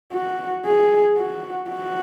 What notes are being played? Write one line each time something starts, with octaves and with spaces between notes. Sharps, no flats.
F#4
G#4
F#4
F#4